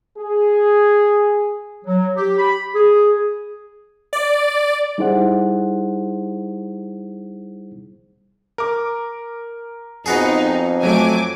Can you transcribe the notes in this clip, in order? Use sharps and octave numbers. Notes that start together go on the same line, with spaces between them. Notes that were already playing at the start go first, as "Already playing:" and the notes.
G#4
F#3
G4
B5
G#4
D5
G3 D#4 E4 G#4 C5 F#5
A#4 D6
F2 B3 D#4 F#4 G#4
F#3 A3 G#5 D6